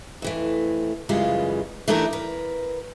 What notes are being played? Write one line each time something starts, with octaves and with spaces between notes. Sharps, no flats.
F2 E3 A3
F#2 C#3 E3 G3 G#3 F4
E3 A3 D4 D#4 A4 A#4
A#4 B4